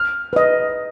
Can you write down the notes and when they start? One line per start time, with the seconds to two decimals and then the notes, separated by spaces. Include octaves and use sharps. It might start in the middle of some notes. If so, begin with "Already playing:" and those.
Already playing: F6
0.33 B4 D#5